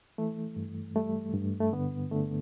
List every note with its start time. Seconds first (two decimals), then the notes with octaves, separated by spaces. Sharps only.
0.18 E3 A3
0.56 G2
0.96 G3 A3
1.34 G2
1.61 A3
1.73 D3 B3
2.11 D3 A3